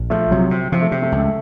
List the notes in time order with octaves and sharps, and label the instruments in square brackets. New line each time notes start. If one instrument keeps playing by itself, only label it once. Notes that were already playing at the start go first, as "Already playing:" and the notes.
Already playing: [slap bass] A#1
[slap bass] F3 [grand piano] A3
[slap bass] C3 [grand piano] F#3
[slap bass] C3
[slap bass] C3 [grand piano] F3
[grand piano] A3
[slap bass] C3
[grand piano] A3
[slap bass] C#2